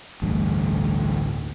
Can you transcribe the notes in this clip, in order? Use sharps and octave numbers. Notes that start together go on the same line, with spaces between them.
A1 D2 G2